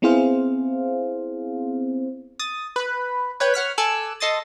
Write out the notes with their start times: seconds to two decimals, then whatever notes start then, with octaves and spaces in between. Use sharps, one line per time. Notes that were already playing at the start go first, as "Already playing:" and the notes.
0.02 B3 C4 E4 G#4 C5 F5
2.39 D#6 A6
2.76 B4 B5
3.40 B4 C#5 G5
3.54 C#5 F#5 F6 B6
3.78 A4 G#5 D6 E6 F#6
4.20 A4 D#5 C6 D#6 A6